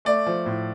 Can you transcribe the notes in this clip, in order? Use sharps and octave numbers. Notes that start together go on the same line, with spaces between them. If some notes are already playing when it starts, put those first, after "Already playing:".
A3 D5
F3
A2